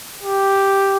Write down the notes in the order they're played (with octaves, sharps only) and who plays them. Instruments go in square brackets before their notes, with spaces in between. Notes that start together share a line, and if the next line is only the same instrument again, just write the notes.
[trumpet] G4